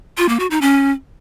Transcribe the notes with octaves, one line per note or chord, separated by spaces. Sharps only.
F4
A#3
F#4
D#4
C#4